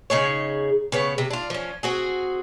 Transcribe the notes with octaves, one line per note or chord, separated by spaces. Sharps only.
C#3 D#4 G#4 C#5
C#3 B3 C#5
C3
D4 F4
F3 C#4
C4 F#4 G#4